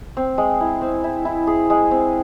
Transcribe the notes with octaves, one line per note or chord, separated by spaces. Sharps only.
C4
G#3
E4
C4
E4
E4
G#4
G#3
C4